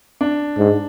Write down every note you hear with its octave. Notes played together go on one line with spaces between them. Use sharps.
D4
G#2